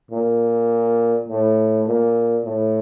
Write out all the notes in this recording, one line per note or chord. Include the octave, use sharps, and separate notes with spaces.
A#2
A2
A#2
A2